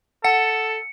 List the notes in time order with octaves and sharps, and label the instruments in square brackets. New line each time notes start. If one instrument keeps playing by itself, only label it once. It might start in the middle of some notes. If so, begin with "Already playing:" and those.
[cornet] A4 [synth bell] F#5 [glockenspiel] C#7